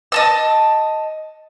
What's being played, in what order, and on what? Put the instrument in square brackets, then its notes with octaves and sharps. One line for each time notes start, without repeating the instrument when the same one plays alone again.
[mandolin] D#5 A5 E6